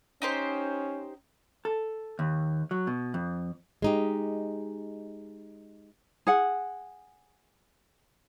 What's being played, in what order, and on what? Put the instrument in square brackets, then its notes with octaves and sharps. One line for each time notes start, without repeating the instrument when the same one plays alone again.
[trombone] C#4 [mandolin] D#4 G4 C5
[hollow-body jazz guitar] A4
D#2
F#3
B2
F2
[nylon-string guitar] G#3 D#4 G4
[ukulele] G#4 F#5